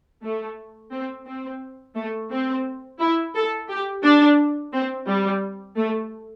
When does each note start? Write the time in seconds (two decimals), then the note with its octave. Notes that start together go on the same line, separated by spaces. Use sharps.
0.23 A3
0.92 C4
1.27 C4
1.96 A3
2.31 C4
3.00 E4
3.35 A4
3.69 G4
4.03 D4
4.73 C4
5.07 G3
5.77 A3